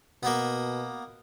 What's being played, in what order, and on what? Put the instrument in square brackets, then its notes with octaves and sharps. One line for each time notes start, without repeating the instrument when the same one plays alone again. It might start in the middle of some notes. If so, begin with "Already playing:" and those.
[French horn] B2 [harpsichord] A#3 B3